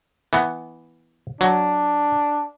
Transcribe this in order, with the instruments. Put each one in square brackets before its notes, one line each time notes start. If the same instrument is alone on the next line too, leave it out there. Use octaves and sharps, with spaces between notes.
[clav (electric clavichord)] E3 B3
[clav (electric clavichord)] F#3 [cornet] D4